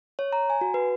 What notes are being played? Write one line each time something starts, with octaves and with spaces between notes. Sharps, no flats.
C#5
A#5
G#5
F#4
B4